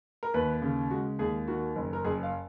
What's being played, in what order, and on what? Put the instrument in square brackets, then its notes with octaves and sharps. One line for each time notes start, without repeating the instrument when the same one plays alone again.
[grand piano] A#4
D#2 B4
C#3
G#3 F#4
D#2 G#4
D#3 F#4
F#1
A#4
F#1 G#4
F5